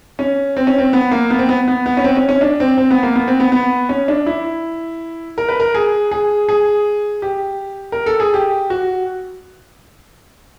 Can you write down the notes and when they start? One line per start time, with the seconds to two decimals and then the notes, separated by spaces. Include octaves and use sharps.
0.19 C#4
0.57 C4
0.67 C#4
0.78 C4
0.93 B3
1.11 A#3
1.30 B3
1.39 C4
1.49 B3
1.68 B3
1.86 B3
1.97 C#4
2.04 C4
2.17 C#4
2.29 C#4
2.41 D4
2.60 C4
2.78 C4
2.91 B3
3.03 A#3
3.15 B3
3.28 C4
3.40 B3
3.52 B3
3.89 C#4
4.08 D4
4.26 E4
5.38 A#4
5.49 B4
5.60 A#4
5.74 G#4
6.11 G#4
6.49 G#4
7.22 G4
7.92 A#4
8.06 A4
8.20 G#4
8.34 G4
8.70 F#4